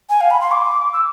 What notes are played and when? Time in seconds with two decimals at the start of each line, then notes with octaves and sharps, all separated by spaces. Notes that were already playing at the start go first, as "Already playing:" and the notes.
0.10 G#5
0.21 F5
0.31 B5
0.41 C6
0.52 D6
0.93 E6